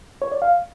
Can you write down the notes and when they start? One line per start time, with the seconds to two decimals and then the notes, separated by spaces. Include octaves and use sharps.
0.22 C#5
0.32 D5
0.42 F5